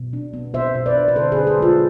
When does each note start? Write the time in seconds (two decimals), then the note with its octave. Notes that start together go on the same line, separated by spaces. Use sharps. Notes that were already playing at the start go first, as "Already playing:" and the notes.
Already playing: B2
0.13 D4
0.34 B3
0.54 B2 C5 E5
0.75 B2
0.86 B4 D5
0.95 D4
1.08 B4
1.16 D3 A4 C5
1.32 G#4 B4
1.37 D4
1.47 A4 C5
1.58 G#3 F4 A4